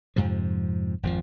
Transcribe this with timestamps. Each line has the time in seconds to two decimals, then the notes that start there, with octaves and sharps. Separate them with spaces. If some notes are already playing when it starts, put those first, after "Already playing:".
0.16 F2 G#2 C3 F3
1.03 G#1 F2 D#3 F3